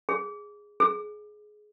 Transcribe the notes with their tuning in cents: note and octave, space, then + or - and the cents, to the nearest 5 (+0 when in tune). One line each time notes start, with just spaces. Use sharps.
G#4 -5
G#4 +20